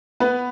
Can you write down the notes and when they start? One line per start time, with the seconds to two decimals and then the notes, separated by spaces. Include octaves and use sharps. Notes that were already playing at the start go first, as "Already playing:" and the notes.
0.20 B3 B4